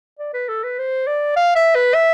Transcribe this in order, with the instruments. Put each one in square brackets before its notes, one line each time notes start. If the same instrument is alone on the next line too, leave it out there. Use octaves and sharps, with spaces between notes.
[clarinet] D5
B4
A4
B4
C5
D5
F5
E5
B4
E5